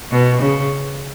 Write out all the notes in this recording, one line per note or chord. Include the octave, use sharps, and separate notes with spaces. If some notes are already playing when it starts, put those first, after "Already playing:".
B2
C#3